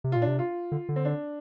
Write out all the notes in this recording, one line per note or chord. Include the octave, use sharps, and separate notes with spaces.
C3
A#2 F4
D4
C3
F4
D3
D3
C4
D4